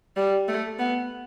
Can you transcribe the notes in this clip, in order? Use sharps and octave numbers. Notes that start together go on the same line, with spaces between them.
G3
A3
B3